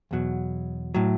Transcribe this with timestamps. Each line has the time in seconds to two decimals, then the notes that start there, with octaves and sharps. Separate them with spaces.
0.11 E2 B2 F#3
0.95 A2 F#3